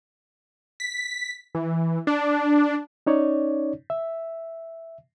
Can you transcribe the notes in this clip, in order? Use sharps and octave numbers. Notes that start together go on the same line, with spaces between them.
B6
E3
D4
C#4 D#4 C#5 D5
E5